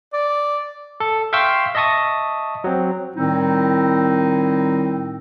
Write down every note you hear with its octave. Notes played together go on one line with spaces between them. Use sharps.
D5
A4
E5 F5 G5 C6 C#6 E6
D#5 E5 A5 C#6 D#6
F#3 C4
A2 D#3 G3 C4 D#4 E4